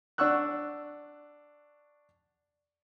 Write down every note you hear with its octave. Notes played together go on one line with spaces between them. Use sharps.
D4 F#5 C#6 E6 F#6